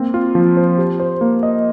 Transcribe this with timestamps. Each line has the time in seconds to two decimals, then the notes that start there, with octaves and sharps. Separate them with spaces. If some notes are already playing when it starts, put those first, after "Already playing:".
Already playing: A#3 C4
0.14 F4
0.35 F3
0.57 C5
0.78 G4
1.00 C5
1.21 A#3
1.43 D#5